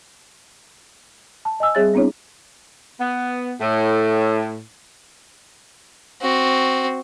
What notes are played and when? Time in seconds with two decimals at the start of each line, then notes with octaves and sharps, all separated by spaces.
1.45 A5
1.60 D#5 G#5 E6
1.75 G3 C4 G#4 C#5 E5 A6
1.94 B3 C4 D4 E4 C#5
3.00 B3
3.60 A2
6.22 C4 F#4